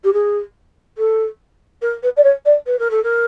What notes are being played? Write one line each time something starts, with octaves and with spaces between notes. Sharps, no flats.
G4
G#4
A4
A#4
B4
D5
C#5
D5
B4
A#4
A4
A#4